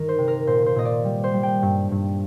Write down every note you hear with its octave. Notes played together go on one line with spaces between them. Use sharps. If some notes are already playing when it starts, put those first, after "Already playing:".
Already playing: G2 D#3 A#4
C5
C3
A#4
A#2 C5
C5
A#2 D#5
D5
G3
C5
G3
G5
G2
G2